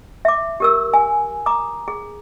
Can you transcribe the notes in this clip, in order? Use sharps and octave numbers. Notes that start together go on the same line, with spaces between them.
E5 D6
G4 A#4 E6
G#5
A#5 D6 D#6
G#4